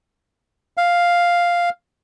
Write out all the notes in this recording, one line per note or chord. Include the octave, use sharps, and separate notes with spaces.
F5